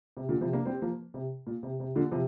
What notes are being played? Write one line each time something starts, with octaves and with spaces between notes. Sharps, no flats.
C3
A#2 D3
C3 F3
A#3 D4
G3 C4
F3 A#3
C3
A#2
C3
C3
A#2 D3
C3 F3